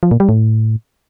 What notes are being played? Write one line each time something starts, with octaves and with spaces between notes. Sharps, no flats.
F3
A#2
G3
A2